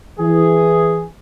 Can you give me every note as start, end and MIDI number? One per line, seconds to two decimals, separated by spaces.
0.20 1.02 52
0.20 1.02 68